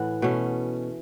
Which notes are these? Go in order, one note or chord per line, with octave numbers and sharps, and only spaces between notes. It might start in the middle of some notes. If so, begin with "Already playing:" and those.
Already playing: A2 E3 F#5
B2 A3 C#4